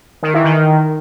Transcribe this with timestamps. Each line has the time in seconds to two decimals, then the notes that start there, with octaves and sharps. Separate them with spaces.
0.23 D#3
0.34 E3
0.44 D#3